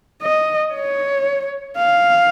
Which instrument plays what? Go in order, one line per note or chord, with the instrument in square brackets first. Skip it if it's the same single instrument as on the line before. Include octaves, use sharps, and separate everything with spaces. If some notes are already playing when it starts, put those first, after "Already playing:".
[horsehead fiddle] D#5
C#5
F5